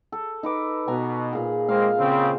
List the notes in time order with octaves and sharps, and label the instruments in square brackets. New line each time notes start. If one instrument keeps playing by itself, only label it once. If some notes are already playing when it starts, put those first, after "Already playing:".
[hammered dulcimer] A4
D#4 B4 D6
[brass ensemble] B2 [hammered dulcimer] G#5 A#5
[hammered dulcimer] A#2 G#4
[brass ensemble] G#3 A#3 C4 [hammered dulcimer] F5
[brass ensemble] C#3 C4